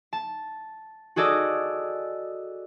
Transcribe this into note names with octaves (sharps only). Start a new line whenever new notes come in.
A5
F#4 G#4 A4 D5 D#5 D#6